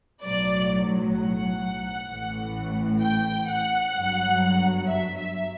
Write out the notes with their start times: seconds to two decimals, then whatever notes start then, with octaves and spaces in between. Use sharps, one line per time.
0.23 B1 A2 F#3 D5
1.15 F#5
2.08 A1 A2 E3
3.01 G5
3.48 F#5
3.94 G1 G2 F#3
4.87 E5
5.17 E5